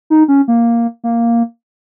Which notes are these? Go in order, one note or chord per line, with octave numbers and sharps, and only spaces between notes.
D#4
C#4
A#3
A#3